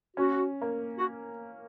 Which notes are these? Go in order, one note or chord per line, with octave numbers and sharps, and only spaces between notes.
C#4 F#4
A#3
F#4